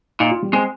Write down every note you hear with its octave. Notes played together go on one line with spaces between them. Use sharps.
A#2 D#4
F4
G3
G#3 C4